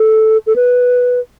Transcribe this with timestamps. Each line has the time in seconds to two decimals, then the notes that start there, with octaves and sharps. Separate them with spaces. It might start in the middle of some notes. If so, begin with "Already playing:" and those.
Already playing: A4
0.47 A4
0.56 B4